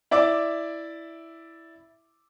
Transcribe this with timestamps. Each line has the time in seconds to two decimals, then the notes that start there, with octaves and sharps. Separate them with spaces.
0.11 E4 D5 E5 D6